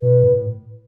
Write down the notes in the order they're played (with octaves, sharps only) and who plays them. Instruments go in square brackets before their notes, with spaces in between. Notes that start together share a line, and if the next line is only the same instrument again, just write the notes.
[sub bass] B2 [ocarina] B4
[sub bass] A2